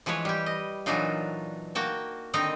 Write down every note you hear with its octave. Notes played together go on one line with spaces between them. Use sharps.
E3 F3 G#3 B4 C#5
G3 G4
D#5
A#2 E3 F#3 D4 D#4 F4
A#3 F#4 G5 A5
D3 D#3 C4 D#4 D#5 A#5